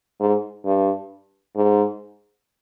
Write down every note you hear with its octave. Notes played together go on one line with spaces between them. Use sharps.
G#2
G2
G#2